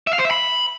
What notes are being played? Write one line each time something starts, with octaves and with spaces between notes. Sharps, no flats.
E5
F5
C5
E5
B5